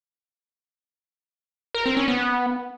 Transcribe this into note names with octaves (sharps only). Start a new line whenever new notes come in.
A#4
C4
C#4
B3